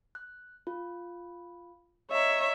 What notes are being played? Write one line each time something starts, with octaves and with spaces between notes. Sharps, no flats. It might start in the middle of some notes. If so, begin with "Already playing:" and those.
F#6
F4
C#5 D#5 E5 A#5